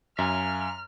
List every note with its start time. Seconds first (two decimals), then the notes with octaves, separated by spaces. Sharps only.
0.19 F#2 E5 F5 G#5 A#5 F6